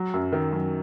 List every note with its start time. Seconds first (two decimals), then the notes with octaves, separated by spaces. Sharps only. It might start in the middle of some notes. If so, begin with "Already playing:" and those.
Already playing: F#3
0.14 F#2
0.32 D#3
0.53 F#2